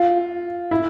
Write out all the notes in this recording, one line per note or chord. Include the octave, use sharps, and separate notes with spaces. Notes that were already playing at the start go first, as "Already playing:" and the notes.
Already playing: F4
E4